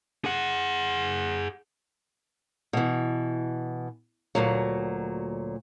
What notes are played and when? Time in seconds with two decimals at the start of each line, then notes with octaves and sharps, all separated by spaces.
0.25 G#4 F#5
2.73 B2 E3
4.35 D2 A#2 F#3